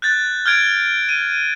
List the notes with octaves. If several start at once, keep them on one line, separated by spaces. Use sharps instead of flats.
F#6 G6 A6
F6 G6 G#6 D7
D#7